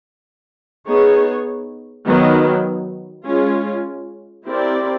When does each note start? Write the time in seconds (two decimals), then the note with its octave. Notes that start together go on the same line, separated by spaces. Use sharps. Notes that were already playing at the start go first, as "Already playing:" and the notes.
0.87 B3 D#4 G#4 C#5
2.06 D#3 F#3 B3
3.27 G#3 C#4 F4
4.47 C4 E4 G4 A#4 D5